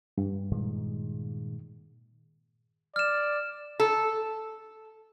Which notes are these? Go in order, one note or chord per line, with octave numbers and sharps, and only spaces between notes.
G2
A#2 D#3 G#3
D5 F6 E7
A4